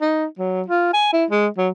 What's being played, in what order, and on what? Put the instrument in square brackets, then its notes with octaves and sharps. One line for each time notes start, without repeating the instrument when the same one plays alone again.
[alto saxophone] D#4
F#3
F4
G#5
E4
G#3
F#3